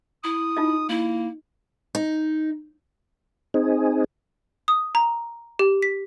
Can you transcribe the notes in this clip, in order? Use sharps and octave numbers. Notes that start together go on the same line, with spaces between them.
E4 D#6
D#4 F4 D#5
A#3 E4
D#4
C4 D#4 G#4
D#6
A#5
G4
B6